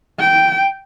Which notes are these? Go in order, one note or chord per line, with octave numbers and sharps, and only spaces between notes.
G5